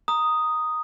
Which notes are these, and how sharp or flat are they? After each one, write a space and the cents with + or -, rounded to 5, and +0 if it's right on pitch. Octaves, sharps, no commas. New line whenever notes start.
A#5 +0 D#6 +0